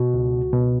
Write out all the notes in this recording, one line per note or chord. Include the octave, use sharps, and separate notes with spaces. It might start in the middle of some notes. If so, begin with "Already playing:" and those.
Already playing: B2 F#4
C#2
B2